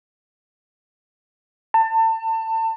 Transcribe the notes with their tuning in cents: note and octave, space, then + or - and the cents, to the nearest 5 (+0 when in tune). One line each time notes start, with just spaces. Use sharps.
A5 +30